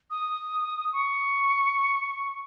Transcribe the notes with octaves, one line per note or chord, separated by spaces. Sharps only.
D#6
C#6